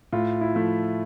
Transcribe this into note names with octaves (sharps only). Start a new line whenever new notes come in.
A2 F4
E4
F3 A3